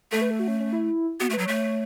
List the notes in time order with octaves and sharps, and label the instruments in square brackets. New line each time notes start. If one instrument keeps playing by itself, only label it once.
[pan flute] A3 [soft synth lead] A4
[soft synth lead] B4
A4
F#4
C#4
C#4
E4
[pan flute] B3 [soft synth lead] F#4
[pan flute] A3
[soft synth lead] B4
[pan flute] F#3
[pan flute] A3 [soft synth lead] C#5